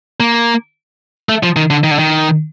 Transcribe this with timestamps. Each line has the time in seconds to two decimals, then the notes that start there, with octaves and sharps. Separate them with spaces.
0.20 A#3
1.29 A3
1.43 F3
1.56 D#3
1.70 D3
1.84 D#3
1.91 D3
1.99 D#3